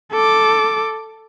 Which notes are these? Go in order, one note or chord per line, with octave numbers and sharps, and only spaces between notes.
A4 D6